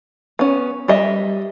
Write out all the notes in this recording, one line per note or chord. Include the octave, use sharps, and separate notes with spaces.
B3 C#4
G3 D#5 E5